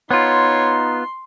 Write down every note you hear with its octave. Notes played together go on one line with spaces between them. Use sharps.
B3 D#4 F4 C#5 C6